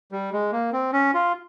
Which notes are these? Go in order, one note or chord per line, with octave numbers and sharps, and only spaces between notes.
G3
G#3
A#3
C4
C#4
F4